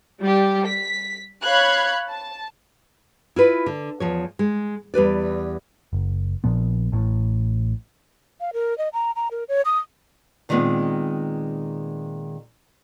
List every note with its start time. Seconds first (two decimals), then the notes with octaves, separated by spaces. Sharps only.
0.21 G3 G4
0.67 B6
1.43 C#5 F5 B5 F#6 G#6
2.09 A5
3.36 E4 F4 B4
3.66 D3
4.00 E2 F3 C#5
4.39 G#3
4.94 E2 G3 B4 D5
5.93 F#1
6.44 A#1 A#2 F3 B3
6.92 A1 A2
8.40 F5
8.53 A#4
8.78 D#5
8.93 A#5
9.16 A#5
9.31 A#4
9.48 C#5
9.65 D#6
10.49 A#2 D#3 G3 G#3 B3 C4